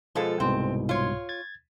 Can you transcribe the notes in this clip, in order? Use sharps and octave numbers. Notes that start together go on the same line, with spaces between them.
B2 F3 G#3 F4 A4
C2 G#2 B2 C4
F4 C#5
G#6 A6